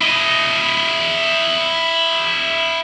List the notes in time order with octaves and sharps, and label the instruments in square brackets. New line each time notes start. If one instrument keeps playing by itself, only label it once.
[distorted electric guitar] E4 D#5